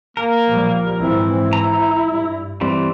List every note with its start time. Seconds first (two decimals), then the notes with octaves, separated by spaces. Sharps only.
0.17 A#3 A#4
0.48 A#2 F3 G3
0.99 G#2 E3 C4 E4
1.53 A#5
2.09 G2
2.61 E3 G3 C4